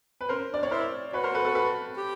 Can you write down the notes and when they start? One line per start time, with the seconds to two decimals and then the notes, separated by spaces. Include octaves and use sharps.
0.21 B4
0.29 C#4 A#4 C5
0.51 D4 D5
0.63 C#5
0.71 E4 A#4 C5
1.13 F#4 B4 C#5
1.24 A#4 C5
1.35 A4 B4
1.45 A4 B4
1.55 A4 B4
1.97 G4